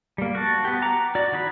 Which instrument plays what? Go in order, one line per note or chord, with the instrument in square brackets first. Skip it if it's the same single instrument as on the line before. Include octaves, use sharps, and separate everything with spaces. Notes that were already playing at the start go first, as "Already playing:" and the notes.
[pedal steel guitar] G3 A#3
F#4 A5
B3 G4
F#5 A#5 D6
F#4 D5
D#3 G#4 B5